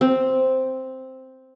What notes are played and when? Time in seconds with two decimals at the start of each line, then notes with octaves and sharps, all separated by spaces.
0.01 C4